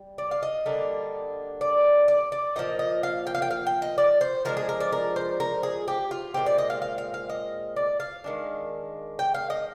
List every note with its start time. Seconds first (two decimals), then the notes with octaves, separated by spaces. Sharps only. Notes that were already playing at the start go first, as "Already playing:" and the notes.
Already playing: G3
0.18 D5
0.31 F5
0.43 D#5
0.66 D3 G3 A#3 D4
1.61 D5
2.08 D5
2.32 D5
2.56 A#2 F3 C4 D#4 D#5
2.79 D#5
3.03 F5
3.27 G5
3.35 F5
3.42 G5
3.51 F5
3.67 G5
3.82 D#5
3.98 D5
4.21 C5
4.45 F3 G#3 D4 A#4
4.57 G#4
4.69 A#4
4.80 D5
4.92 A#4
5.16 C5
5.40 A#4
5.63 G#4
5.88 G4
6.11 F4
6.34 A#2 F3 G#3 C4 G4
6.46 D5
6.58 D#5
6.70 F5
6.82 F5
6.98 F5
7.14 F5
7.30 D#5
7.76 D5
8.00 F5
8.24 D#3 G#3 D4
9.19 G5
9.34 F5
9.50 D#5